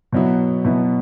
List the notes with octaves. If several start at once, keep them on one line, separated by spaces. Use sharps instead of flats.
B2 F#3 B3 E4
B2 F#3 B3 E4